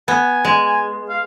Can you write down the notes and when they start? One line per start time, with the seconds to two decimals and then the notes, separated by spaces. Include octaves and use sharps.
0.08 B3 G#5
0.45 G#3 G#5
0.66 G#5
1.09 F5